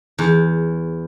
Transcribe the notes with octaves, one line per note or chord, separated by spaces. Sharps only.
E2